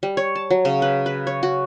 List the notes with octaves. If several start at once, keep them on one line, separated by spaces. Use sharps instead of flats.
G3
C#5
A5
F#3
C#3
B4
B4
C#5
F#4